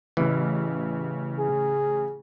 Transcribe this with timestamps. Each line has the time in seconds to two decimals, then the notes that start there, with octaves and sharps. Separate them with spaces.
0.17 A1 C#3 E3
1.39 G#4